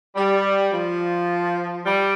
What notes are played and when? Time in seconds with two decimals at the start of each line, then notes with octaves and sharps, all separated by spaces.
0.16 G3
0.73 F3
1.86 G3